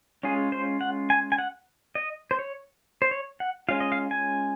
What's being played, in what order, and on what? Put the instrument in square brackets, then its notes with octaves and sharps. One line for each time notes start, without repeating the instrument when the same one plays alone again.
[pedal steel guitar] G#3 C#4 F4 G#4
C5
F#5
G#5
G#5
F#5
D#5
C5
C#5
C5
C#5
F#5
G#3 C#4 F4 F5
D#5
F5
G#5